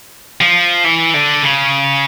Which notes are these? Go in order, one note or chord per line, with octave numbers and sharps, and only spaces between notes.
F3
E3
D3
C#3